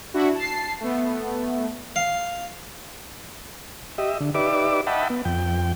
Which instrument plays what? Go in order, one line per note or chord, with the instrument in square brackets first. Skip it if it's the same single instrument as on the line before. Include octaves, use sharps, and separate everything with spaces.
[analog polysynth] D4 E4 F#4
A5 C7
A3 B3
[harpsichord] F5
[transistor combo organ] G4 D#5 E5
D3
D#4 G4 B4 D5 E5 D6
D#5 E5 F#5 G5 A5 B5
B3
F2 G5